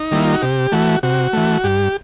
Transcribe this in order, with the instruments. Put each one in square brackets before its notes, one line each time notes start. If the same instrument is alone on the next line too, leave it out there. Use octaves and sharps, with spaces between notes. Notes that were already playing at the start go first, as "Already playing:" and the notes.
Already playing: [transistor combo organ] D#4
D#3 G3 A#3 E4
F4
F#4
C3 G4
E3 A3 F#4
C3 F#4
E3 A3
G2 G4